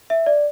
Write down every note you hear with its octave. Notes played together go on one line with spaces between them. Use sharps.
E5
D5